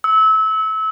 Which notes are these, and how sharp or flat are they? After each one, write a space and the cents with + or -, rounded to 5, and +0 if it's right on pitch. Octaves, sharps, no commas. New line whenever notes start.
E6 -25